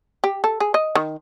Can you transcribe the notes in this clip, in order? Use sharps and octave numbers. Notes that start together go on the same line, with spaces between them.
G4
A4
G#4
D#5
D#3